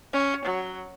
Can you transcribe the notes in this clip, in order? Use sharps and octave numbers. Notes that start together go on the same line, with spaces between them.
C#4
F#3